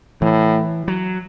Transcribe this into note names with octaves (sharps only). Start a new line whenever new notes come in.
A2 E3
F#3